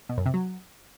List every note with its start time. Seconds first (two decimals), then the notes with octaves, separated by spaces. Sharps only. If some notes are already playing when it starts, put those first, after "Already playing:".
0.09 B2
0.18 F#2
0.26 C3
0.34 F#3